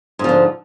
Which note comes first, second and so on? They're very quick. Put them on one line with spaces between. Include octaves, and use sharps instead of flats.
G#2 F3 D3